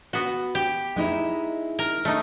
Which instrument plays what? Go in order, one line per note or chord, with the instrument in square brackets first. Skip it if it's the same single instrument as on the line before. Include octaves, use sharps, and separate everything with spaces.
[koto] B3 F#4
G4
[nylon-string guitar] G#3 D#4 E4
[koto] A#4
A3 D#4